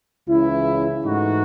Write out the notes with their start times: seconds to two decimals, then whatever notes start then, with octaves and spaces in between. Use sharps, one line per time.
0.28 C#2 C#3 E3 C#4 E4
1.04 G#2 E3 A3 D#4 F#4